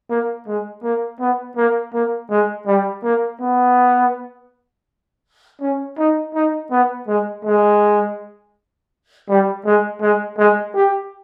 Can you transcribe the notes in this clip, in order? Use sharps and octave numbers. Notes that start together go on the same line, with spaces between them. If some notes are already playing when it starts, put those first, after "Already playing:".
A#3
G#3
A#3
B3
A#3
A#3
G#3
G3
A#3
B3
C#4
D#4
D#4
B3
G#3
G#3
G3
G#3
G#3
G#3
G4